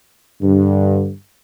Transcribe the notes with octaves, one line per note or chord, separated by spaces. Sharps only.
G2 D3